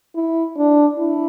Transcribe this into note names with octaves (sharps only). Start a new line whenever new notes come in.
E4
D4
E4